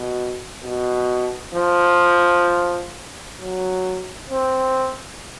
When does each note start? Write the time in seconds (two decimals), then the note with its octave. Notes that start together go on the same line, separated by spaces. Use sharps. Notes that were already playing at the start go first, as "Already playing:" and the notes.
Already playing: B2
0.63 B2
1.54 F3
3.37 F#3
4.30 C4